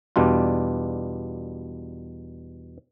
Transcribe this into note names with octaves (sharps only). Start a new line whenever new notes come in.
E2 B2 G3 D4 F4